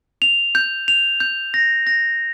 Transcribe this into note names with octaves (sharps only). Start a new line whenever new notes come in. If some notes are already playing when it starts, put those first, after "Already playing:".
F7
G6
F7
G6
A#6
A#6